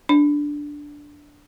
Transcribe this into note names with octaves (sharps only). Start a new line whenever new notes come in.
D4